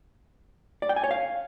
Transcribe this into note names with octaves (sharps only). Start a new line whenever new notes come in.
D5
G5
G#5
C#5
F5